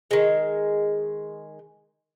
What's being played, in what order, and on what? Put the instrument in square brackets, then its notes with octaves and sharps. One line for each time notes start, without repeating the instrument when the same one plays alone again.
[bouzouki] D#3 G#3